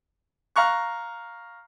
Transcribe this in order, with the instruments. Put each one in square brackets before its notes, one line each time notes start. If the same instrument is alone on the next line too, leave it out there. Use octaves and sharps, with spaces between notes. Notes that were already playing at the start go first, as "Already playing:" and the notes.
[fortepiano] F5 A#5 C#6 F#6